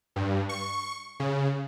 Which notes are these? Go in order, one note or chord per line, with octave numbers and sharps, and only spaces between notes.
G2
C#6
C#3